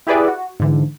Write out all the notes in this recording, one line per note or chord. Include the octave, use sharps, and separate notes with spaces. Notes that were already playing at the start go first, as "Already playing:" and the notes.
E4 G4 G#4 B4 D5 E5
F#4
G#2 D3 E3